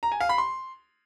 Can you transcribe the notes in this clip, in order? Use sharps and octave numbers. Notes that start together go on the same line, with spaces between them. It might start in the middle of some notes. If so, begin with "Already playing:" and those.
A#5
G#5
F5
B5
C6